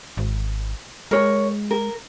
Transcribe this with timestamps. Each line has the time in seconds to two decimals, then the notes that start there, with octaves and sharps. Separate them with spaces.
0.17 G#1
1.11 G#3 A#4 C#5
1.71 A#4